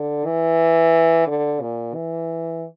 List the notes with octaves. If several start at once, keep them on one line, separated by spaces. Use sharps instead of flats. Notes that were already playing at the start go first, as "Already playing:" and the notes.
Already playing: D3
E3
D3
A#2
E3